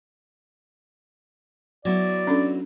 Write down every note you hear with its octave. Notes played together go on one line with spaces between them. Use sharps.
F#3 B3 E4 D5
C#4 D4 A4